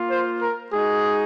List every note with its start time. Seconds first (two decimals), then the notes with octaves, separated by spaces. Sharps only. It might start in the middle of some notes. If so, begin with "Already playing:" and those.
Already playing: A#3 F4
0.10 C5
0.41 A#4
0.72 G#3 D#4 F#4 G#4